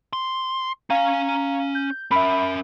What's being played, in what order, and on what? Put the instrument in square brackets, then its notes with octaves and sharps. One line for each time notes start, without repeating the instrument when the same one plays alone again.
[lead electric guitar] C6
[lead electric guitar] C#4 G#5 [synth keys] F5 A#5
[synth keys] G6
[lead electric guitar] C#4 A#4 [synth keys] E5 B5